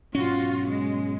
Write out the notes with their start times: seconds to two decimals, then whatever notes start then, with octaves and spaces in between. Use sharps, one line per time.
0.15 G#2 B2 F#3 C#4 F4 F#4
0.67 G#3